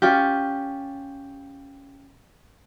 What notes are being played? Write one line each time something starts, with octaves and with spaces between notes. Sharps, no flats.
C#4 F4 G4